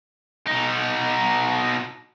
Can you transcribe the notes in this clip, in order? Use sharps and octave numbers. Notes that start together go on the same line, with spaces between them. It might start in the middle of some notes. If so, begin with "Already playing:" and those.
B2 D#4